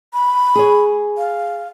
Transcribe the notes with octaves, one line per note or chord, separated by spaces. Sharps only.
B5
G#4 C#5
F5